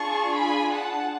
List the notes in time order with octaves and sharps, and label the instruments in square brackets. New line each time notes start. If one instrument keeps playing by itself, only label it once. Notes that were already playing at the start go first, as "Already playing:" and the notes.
Already playing: [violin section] D4 F4 G#4 A5 C#6
G#5 B5
F#5 A5